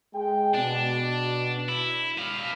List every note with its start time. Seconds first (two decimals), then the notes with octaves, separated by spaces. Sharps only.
0.14 G#3 G#4 G5
0.55 B2 D4
1.69 E4
2.18 B4 F5